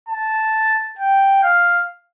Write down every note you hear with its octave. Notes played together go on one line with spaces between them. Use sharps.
A5
G5
F5